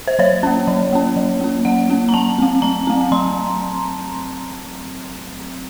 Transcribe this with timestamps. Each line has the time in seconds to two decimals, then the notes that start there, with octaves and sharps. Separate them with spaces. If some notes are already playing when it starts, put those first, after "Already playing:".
0.08 C5
0.19 F#3 C#5
0.43 A#3 C#4
0.68 F#3
0.93 A#3 C#4
1.16 F#3
1.41 A#3 C#4
1.65 F#3 F#5
1.89 A#3 C#4
2.09 A#5
2.14 F#3 A5
2.38 A3 C4
2.62 F#3 A#5
2.87 A3 C4
3.12 F#3 C6